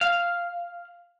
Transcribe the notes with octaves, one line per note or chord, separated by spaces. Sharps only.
F5